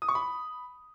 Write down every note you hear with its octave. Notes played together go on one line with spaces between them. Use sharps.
D#6
C#6
B5